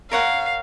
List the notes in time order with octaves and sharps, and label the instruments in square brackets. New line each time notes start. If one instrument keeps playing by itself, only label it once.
[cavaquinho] A#4 C#5 F#5 [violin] F5